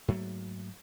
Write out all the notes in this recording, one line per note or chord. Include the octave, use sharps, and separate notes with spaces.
G#2 F#3 A3 A#3